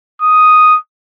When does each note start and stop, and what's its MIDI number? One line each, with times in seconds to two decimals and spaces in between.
0.22 0.77 87